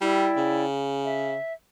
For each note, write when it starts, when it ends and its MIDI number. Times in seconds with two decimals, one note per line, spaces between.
0.01 0.30 55
0.01 0.64 64
0.01 0.64 74
0.01 0.64 79
0.37 1.35 49
1.05 1.53 76